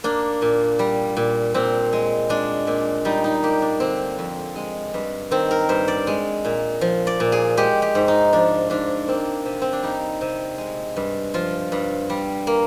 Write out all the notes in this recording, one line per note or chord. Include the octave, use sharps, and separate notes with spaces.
A#3 D4
A#2
G3
A#2
A#2 C4
G#3
G#3 D4
A#2
G3 D#4
D#4
A#3 G4
D4
D3 C4
F2
G#3
G2
D#3 C4
A#4
G2 C5
D5
G#3
A#2
F3
D5
A#2
G#4
G#3 G4
G4
G#2
D#4
F3 D4
G#2 D4
A#3 C4
C3
C4
D4
G3 D#4
C3
G#3
G2
F3 F4
G2
G3
A#3